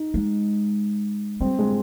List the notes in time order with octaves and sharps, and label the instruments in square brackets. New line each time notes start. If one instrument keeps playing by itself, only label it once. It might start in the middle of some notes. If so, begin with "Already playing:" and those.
Already playing: [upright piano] D#4
[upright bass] G#3
[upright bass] G3 [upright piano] C4
[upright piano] G#3